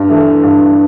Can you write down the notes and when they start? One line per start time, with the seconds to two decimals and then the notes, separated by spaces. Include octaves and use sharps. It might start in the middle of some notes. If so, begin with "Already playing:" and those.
Already playing: G2
0.09 E3 A3
0.43 G2